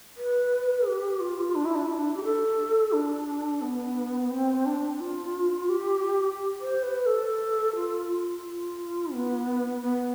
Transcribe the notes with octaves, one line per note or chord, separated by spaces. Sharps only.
B4
G4
F4
D4
E4
D4
E4
D4
G4
A4
D4
B3
C4
D4
F4
G4
C5
B4
A4
F4
F4
B3
B3